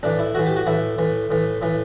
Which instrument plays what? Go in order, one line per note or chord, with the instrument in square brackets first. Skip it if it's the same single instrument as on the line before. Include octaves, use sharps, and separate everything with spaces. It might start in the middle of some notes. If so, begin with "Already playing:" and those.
[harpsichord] A2 E3 D4
E4
A2 E3 F#4
G4
F#4
A2 E3 E4
A2 E3
A2 E3
A2 E3